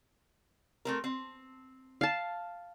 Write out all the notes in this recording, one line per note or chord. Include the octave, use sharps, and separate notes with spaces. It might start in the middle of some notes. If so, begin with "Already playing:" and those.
A3 C4 A#4
C4
F5 A5